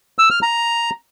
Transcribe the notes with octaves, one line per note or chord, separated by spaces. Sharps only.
E6
F6
A#5